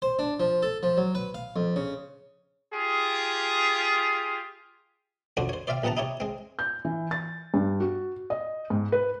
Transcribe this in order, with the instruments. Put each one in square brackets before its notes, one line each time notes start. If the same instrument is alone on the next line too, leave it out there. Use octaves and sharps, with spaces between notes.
[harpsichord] C5
D4
F3
A4
F3
F#3
B4
F5
F2
C#3
[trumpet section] F4 G4 G#4
[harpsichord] F2 D3 D4 F#4 C5
C5 C#5
C5 D5 E5 F5 G5
A#1 C3 B3 F#5 A5 A#5
D#4 E4 G4 C#5
G#3 C4
[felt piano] G6
E3
A6
G2
F#4
D#5
G#2
B4